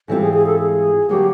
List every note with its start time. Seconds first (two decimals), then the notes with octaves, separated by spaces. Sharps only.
0.08 G#2 E3 G3 C4 F4 A4
0.21 G#4
0.34 G#4
0.46 A4
0.59 G#4
1.09 D3 F#3 A#3 G4